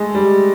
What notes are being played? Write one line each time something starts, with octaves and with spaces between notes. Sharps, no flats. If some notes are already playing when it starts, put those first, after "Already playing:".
Already playing: G#3 A3
G3